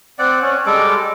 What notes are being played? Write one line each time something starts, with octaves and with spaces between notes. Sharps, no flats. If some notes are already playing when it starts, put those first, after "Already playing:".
C4 D5 F#5
C#4
G3 G#3 A4 D6